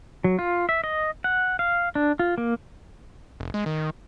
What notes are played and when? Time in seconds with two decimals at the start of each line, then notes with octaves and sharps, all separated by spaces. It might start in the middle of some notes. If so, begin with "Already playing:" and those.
0.24 F#3
0.39 F4
0.69 E5
0.84 D#5
1.24 F#5
1.59 F5
1.95 D4
2.19 F4
2.38 A#3
3.40 F1
3.54 G#3
3.66 D#3